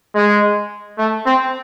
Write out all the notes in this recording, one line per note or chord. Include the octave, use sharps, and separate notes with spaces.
G#3
A3
C4